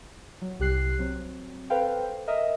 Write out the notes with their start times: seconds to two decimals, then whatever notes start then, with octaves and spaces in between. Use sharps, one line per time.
0.41 F#3
0.59 C2 G4 F#6 C7
0.99 F#3 C4
1.70 A4 B4 C5 F5 G5
2.27 A#4 D#5 E5